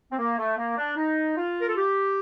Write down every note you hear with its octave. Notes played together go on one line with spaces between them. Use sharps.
C4
A#3
A3
A#3
D4
D#4
F4
A#4
A4
G4